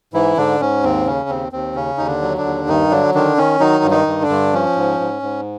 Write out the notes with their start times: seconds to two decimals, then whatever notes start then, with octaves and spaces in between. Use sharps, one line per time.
0.13 G#2 E3 E4
0.37 G#2 D3 D4
0.61 G#2 C#4
0.83 D#2 C4
1.06 C#3 C#4
1.29 D#2 C4
1.52 D#2 C4
1.75 C#3 C#4
1.98 D#2 D#4
2.06 D3 D4
2.22 F#3
2.37 D3 D4
2.45 D#2
2.67 G2 D#3 D#4
2.91 D3 F#3 D4
3.14 D3 D#3 D4
3.37 D#3 C#4
3.60 D#3 F#3 D#4
3.84 G2
3.91 D#3 D#4
4.07 G2
4.21 D3 D4
4.29 G2
4.53 F3 C#4
4.76 G#2
5.00 G#2
5.23 G#2